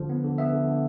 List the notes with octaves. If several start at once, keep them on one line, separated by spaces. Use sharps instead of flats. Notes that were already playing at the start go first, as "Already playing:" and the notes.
Already playing: D3 F3
B3
D3
B3 E5
D3
D3